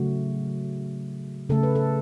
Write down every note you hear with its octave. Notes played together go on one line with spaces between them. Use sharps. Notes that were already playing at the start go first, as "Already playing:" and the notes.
Already playing: C#3 F#3 A3 F#4
C#3 A3 A4
B4
A4